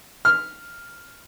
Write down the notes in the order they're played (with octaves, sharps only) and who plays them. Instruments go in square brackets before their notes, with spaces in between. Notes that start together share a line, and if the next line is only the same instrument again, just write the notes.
[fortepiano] F6